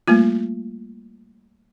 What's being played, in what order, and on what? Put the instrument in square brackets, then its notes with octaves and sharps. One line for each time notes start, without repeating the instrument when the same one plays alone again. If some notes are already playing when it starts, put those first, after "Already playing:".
[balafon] G3 A3 A#3 F4